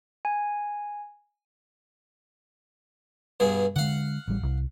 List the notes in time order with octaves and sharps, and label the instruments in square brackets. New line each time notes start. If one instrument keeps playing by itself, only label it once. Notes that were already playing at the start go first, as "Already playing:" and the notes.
[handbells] G#5
[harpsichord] G2 B2 G#4
[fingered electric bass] D3 G#3 [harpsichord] F5 F#5
[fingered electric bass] A1 G3
D#1 C2